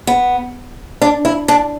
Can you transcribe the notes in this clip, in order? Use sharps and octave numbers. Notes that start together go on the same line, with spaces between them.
B3
D4
E4
D4